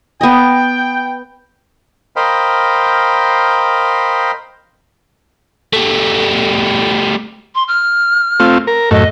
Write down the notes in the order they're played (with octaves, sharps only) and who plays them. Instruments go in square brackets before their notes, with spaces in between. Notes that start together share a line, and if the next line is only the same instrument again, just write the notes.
[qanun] B3 D#5 [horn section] G5
[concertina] A#4 C5 D#5 F5 G5 B5
[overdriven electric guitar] G3 A3
[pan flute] C6
F6
[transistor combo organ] A3 C4 F4
A#4
[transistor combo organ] F#2 A2 A3 [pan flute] D#5